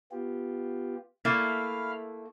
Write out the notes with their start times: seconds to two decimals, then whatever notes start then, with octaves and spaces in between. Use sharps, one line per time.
0.11 B3 F4 G4
1.25 A3 A#3 E4 F5 B5 F6